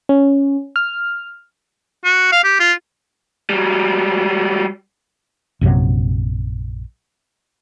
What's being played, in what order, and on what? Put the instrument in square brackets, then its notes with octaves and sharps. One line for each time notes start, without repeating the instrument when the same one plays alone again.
[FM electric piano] C#4
F6
[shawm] F#4
F5
G4
F4
[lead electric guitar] F#3 G3
[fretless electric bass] A#1 F#2 C3 F#3